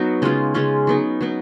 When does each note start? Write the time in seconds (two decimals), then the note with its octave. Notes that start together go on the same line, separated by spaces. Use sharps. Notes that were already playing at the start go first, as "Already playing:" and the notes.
Already playing: F#3 B3 D#4 F#4
0.22 C#3 G#3 C#4 F4
0.54 C#3 G#3 C#4 F4
0.87 F#3 B3 D#4
1.21 F#3 B3 D#4